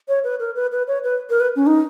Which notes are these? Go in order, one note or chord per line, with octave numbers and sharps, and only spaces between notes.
C#5
B4
A#4
B4
B4
C#5
B4
A#4
B4
C#4
D#4